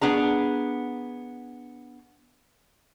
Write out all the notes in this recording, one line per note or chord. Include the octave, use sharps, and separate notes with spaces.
B3 D4 G#4 A#5